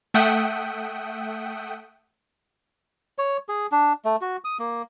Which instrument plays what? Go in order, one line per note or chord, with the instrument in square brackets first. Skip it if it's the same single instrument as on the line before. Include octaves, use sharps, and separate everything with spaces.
[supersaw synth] A3 E5 F#5 G5 D#6
[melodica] C#5
G#4
D4
A3
F#4
D#6
A#3